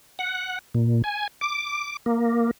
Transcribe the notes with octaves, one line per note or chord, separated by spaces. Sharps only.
F#5
A#2
G#5
D6
A#3